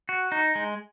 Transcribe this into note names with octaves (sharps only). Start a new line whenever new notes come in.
F#4
D#4
G#3